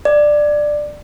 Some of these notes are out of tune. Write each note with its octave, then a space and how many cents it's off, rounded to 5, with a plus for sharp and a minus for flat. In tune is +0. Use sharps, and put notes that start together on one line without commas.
D5 +10